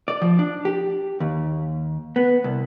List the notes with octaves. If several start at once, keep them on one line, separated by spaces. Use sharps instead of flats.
D5
F3
D4
G4
D#2
B3
C2